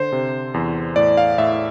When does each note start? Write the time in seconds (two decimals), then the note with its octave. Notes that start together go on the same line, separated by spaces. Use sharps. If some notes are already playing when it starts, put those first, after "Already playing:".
Already playing: D3 C5
0.12 C3
0.54 E2
0.96 A2 D5
1.17 F5
1.38 A2 E5